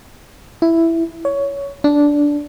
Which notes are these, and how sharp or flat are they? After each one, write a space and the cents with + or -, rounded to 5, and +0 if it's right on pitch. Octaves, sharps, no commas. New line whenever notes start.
E4 +5
C#5 +15
D4 -10